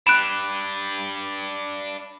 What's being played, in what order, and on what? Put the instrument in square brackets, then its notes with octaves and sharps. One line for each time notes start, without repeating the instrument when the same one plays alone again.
[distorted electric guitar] D4 G4 [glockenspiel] B5 [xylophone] F#6 D7 E7